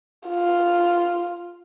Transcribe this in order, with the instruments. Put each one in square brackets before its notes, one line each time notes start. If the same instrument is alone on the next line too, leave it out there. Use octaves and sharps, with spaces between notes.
[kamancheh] F4